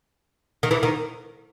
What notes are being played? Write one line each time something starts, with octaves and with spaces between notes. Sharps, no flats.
D#3
E3
D#3